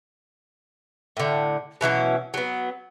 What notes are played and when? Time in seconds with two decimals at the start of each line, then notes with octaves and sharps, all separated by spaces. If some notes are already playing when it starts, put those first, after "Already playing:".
1.17 A2 D3
1.81 B2 E3 F#3 C#4
2.34 F#3 B3